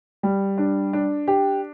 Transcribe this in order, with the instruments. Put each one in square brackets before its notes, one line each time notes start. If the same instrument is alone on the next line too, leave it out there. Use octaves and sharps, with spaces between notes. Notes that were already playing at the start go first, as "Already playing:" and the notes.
[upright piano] G3
D4
D4
G4